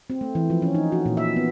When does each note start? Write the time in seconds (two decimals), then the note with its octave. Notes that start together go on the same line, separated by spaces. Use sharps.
0.10 C4
0.21 A3
0.35 E3
0.50 F3
0.62 C#4
0.75 D#4
0.92 F#4
1.06 A#2
1.17 E5
1.36 B3